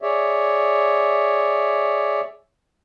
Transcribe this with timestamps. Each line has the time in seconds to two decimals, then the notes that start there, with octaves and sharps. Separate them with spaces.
0.02 G#4 C#5 D5 E5